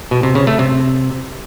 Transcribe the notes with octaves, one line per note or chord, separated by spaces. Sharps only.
B2
C3
C#3
A3
C3